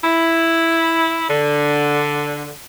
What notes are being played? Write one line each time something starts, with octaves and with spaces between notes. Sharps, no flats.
E4
D3